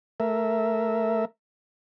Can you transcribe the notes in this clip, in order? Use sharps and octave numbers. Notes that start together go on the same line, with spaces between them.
A3 A#4 E5